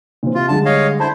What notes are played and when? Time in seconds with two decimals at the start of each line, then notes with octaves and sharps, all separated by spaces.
0.23 A#2 E3 C4
0.35 C3 F4
0.48 D3 G3 G#3 A5
0.65 C#5 D#5 F5
1.00 D3 E4 C5 A5